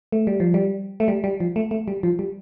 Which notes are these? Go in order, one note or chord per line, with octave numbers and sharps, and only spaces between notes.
A3
G3
F3
G3
A3
G3
G3
F3
A3
A3
G3
F3
G3